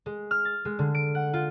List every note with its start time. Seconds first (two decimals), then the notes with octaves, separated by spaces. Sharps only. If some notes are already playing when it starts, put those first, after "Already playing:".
0.06 G#3
0.31 F6
0.45 A6
0.65 G#3
0.79 D3
0.95 D7
1.15 F#5
1.33 F4